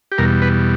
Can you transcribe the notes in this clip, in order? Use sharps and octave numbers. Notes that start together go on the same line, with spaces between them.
G4
E2 B2 G3 A#4
B4